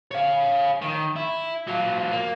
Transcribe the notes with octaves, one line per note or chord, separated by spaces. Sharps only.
C#5 F5
D#3
E4
F#3 F4
A#3